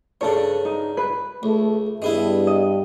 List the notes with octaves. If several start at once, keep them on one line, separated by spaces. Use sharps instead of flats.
G2 C#3 D4 A4 C#5
D#4
B4
C#2 A3
G2 G#3 B3 E4
D#5